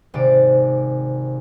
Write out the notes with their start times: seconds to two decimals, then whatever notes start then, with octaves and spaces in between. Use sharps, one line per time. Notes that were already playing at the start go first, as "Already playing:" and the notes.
0.14 G#1 C3 D5